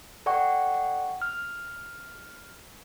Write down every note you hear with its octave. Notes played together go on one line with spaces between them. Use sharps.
A4 D5 F#5 G5 C#6
F6